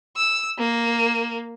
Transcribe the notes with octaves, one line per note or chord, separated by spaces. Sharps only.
E6
A#3